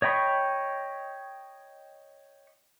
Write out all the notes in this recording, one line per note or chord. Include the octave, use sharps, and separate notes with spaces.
C#5 D#5 G5 B5 C#6